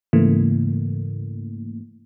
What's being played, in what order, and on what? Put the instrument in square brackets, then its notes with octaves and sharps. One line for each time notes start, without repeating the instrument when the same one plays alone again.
[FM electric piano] G#2 C#3 E3 A3 A#3